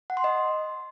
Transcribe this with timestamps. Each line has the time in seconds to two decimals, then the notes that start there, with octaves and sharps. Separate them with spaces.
0.10 F#5
0.17 C6
0.24 D#5